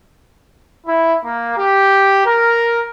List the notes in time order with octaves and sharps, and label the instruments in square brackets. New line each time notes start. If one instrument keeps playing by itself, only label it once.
[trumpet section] E4
A#3
G4
A#4